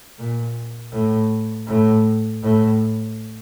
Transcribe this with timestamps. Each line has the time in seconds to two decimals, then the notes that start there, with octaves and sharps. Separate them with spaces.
0.18 A#2
0.92 A2
1.67 A2
2.43 A2